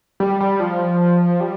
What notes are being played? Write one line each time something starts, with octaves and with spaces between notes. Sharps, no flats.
G3
G3
F3
G3